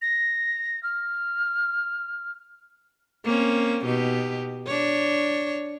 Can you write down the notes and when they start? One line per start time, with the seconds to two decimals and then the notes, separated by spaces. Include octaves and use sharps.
0.02 A#6
0.83 F6
3.24 A#3 C4 C#4
3.86 B2 D#4 G4
4.67 D4 C#5